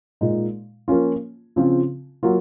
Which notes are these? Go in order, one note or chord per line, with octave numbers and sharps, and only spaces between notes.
A#2 G#3 D#4
F3 A#3 C#4 F4
C#3 F3 C4 F4
F#3 A#3 F4